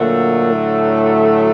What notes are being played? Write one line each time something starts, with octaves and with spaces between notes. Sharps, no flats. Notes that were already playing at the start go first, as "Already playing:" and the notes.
Already playing: A#2 D3 F#3 A3
A2